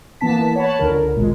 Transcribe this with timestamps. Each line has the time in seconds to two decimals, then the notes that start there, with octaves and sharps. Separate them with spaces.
0.21 E3 A#3 B3 A5 B6
0.56 C#5 F#5 A5 B5
0.79 C#2 D3 A#4
1.15 G#1 A#2 G#3